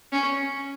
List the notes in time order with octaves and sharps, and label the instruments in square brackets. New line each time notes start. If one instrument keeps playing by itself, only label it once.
[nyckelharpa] C#4